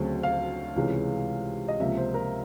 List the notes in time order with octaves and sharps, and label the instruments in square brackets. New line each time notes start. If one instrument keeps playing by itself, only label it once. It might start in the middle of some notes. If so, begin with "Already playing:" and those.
Already playing: [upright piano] D2 C#3 F#3 A3 C4
F5
C#2 C3 E3 G#3 C#4
D#5
C#2 C3 F3 A#3 E5
C5
A#4